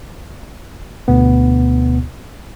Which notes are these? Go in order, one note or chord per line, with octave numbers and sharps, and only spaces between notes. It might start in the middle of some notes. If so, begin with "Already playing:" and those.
D2 B2 B3